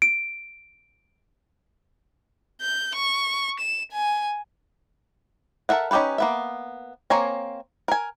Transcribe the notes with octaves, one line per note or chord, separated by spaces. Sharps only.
D7
G6
C#6
E7
G#5
A4 A#4 E5 F#5
C#4 D#4 G4 A4 B4
A#3 B3 E5
A#3 C4 C#5 G#5 A#5
A#4 G#5